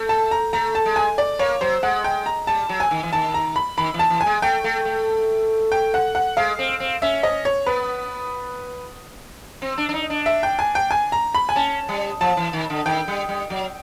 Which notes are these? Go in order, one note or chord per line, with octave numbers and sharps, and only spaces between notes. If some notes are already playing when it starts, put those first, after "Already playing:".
Already playing: A3
A5
A#5
A3 A#5
A5
G#3
G#5
D5
A#3 C#5
F#3 C5
G#3 F#5
G5
A#5
G3 A5
F#3
G#5
D#3
E3
D#3 A5
A#5
B5
D#3 B5
E3
A5
E3
G#5
G#3
A3 G5
A3
A3
G5
F#5
F#5
G#3 F5
C4
C4
C#4 E5
D#5
C#5
B3 B4
C4
D4
D4
D#4
D4
E5
G5
G#5
G5
G#5
A#5
B5
G#5
C#4 A5
G3
F3 A5
E3
D#3
D3
D#3 G5
G3
G3
F#3